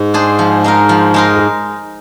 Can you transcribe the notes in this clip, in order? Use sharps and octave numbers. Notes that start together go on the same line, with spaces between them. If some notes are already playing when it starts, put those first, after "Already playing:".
Already playing: G#2
D4 G#4 C5
F3
G#3 D#4 A#4
F3
G#3 D#4 A#4
F2